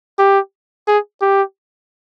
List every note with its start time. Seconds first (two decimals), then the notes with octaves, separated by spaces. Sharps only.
0.19 G4
0.88 G#4
1.22 G4